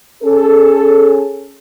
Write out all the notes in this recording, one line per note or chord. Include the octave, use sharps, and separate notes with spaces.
C#4 G#4 A4